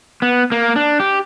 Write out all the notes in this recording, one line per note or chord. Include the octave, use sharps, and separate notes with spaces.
B3
A#3
D4
G4